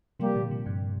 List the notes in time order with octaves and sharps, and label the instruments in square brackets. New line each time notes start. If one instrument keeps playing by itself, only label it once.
[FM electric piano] C3 F3 [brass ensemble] G3 A#3 G4
[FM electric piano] A#2 D3
C3 F3
G2 C3